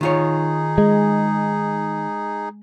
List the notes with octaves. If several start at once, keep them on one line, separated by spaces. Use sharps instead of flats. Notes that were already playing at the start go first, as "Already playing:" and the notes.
D#3 D#4 F4 G#4 C#5
G#3